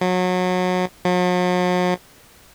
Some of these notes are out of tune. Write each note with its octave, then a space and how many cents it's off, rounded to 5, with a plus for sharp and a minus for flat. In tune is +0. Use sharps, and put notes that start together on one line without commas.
F#3 -25
F#3 -45